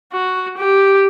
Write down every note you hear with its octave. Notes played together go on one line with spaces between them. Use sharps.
F#4
G4